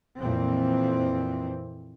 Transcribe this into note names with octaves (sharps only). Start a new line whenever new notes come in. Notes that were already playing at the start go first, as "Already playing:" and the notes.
F2 A#2 E3 C4